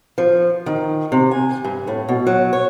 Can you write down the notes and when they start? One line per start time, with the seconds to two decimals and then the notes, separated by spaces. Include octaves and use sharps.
0.18 F3
0.66 D#3
1.12 C3
1.31 G#5
1.65 G2
1.87 A2
2.09 B2
2.27 F#3
2.53 C#5